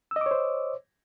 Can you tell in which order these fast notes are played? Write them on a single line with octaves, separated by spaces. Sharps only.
E6 D#5 D6 C#5 C5